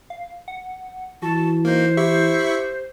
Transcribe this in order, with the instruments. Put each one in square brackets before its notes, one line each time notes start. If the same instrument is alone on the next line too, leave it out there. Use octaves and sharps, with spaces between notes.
[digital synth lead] F5
F#5
[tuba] E3 [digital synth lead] F#4 [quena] A5
[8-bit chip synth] A#3 D#4 [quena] C5
[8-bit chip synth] E4 E5 C#6 [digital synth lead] G4